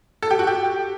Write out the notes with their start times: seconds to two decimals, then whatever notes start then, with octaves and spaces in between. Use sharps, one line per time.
0.23 A4
0.31 G4
0.39 F#4
0.47 G4